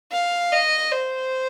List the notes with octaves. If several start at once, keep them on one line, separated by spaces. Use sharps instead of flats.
F5
D#5
C5